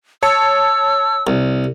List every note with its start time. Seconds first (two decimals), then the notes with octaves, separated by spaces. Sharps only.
0.23 C#5 A5 E6 C#7
1.27 C2